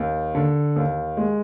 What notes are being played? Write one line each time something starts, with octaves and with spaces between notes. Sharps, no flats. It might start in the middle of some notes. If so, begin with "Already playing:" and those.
Already playing: D#2
D3
D#2
G#3